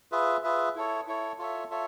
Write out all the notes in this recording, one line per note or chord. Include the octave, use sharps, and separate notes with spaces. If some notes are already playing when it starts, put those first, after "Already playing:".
F4 G#4 B4 E5
F4 G#4 B4 E5
E4 A4 C#5
E4 A4 C#5
F4 A4 C#5 E5
F4 A4 C#5 E5